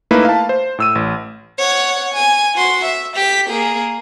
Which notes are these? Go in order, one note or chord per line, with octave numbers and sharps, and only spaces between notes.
A3 A#3 D#4 E4 B4
F5 A5
C5
A2 E6 D#7
A1
C#5 F#5
G#5
F#4 C6
E5
G4 B6
A#3 G#4